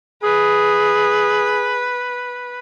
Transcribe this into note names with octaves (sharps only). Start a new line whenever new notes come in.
G#4 B4